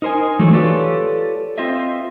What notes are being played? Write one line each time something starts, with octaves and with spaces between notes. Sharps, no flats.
D#4 A#4 C5 D#5 G#5
E3 F#3 A3 A4
F4 G4 A4 B4 C#5 D5
C4 F4 C5 D#5 E5